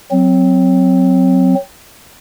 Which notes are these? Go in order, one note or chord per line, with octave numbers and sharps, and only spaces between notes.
F#3 C4